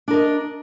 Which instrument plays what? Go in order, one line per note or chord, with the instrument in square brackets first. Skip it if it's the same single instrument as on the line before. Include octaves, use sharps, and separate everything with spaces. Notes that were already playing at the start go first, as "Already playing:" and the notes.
[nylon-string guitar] D4
A#4
D#5